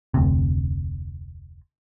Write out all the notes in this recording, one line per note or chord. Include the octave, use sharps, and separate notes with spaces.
F1 D2 C3